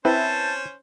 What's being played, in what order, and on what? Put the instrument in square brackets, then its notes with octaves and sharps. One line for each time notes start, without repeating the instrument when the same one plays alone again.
[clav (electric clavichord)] C4 [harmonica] C#4 C5 [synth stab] E4 B4 E5 [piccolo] A5